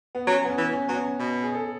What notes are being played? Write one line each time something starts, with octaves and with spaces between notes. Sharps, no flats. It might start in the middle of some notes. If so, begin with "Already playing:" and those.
B3
F#3 C#4
B3
C#4
E3
C#4
F#3 B3
C#4
B2
G#4
A4